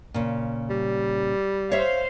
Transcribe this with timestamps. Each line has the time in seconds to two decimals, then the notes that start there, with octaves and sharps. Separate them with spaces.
0.14 A#2 C#3
0.70 G3
1.71 C5 C#5 E5 F5